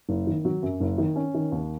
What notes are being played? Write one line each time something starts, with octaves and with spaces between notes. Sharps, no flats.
F#1
D#3
F#3
F#2
F#1
D#3
C#4
D#3
D#2